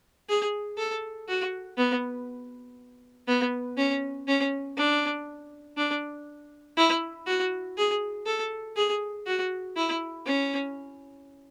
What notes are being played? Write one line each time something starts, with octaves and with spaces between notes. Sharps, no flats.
G#4
A4
F#4
B3
B3
C#4
C#4
D4
D4
E4
F#4
G#4
A4
G#4
F#4
E4
C#4